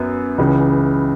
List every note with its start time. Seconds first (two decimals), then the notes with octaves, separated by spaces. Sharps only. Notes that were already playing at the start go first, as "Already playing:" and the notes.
Already playing: F#2 B3
0.38 C#2 C#3 E3